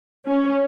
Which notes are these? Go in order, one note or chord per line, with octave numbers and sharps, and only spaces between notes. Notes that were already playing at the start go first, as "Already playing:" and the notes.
C#4